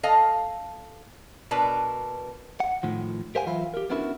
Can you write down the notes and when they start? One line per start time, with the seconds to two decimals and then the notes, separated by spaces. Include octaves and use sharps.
0.03 A4 D#5 F5
1.51 B2 D4 A#4 B4 A5
2.60 F#5
2.83 A2 D#3 F3
3.35 G4 A#4 C5 F5 F#5 G#5
3.46 E3 F#3 F4 E5 F5 B5
3.74 G4 A#4
3.90 B3 C#4 D4 E4 F#4 A#4